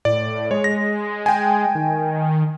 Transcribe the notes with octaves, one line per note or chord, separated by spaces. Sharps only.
A2 D5
G#3 C#5
A#6
G5 G#5
D#3